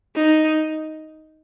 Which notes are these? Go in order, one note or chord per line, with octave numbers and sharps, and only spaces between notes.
D#4